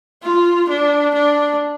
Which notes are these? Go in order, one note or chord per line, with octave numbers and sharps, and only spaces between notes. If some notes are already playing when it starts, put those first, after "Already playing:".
F4
D4
D4